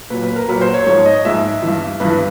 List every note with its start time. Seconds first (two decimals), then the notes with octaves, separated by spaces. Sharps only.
0.10 A#2 F#3 B4
0.23 B4
0.36 A#4
0.49 A#2 F#3 B4
0.61 C5
0.74 C#5
0.86 G#2 F3 C#5
1.06 D#5
1.25 G#2 F3 E5
1.62 G2 E3
2.00 G2 E3 B4